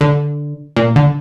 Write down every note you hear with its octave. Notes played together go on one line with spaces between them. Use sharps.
D3
A#2
D3